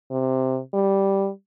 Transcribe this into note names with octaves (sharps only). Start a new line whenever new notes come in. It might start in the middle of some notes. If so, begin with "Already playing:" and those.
C3
G3